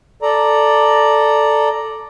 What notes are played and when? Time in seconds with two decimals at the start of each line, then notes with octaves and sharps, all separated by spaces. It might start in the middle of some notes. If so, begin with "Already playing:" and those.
0.22 A4 D5 A#5